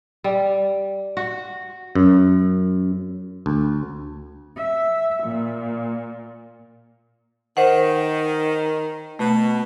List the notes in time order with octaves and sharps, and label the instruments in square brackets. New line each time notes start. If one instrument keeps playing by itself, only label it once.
[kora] G3
F#4
[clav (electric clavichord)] F#2
D2
[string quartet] E5
A#2
[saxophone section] D#3 [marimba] C5 F#5
[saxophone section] B2 [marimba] A3